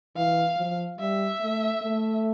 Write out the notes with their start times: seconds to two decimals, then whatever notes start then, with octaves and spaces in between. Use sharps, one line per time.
0.16 E3 F5
0.57 F3
0.99 G3 E5
1.41 A3
1.83 A3